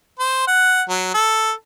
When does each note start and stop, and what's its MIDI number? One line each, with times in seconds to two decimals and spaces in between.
0.19 0.47 72
0.47 0.82 78
0.89 1.13 54
1.14 1.51 69